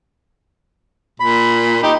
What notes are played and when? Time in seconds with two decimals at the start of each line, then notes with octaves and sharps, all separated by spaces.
1.20 A#2 B5
1.83 D#4 G4